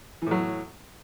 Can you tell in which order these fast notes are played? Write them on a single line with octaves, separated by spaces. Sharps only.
E3 A2 F#3